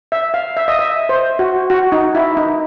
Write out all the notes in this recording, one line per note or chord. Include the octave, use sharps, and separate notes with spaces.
E5
F5
E5
D#5
E5
C5
F#4
F#4
D#4
E4
D#4